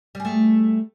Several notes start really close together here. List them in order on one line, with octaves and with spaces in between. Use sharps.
G3 G#4 A3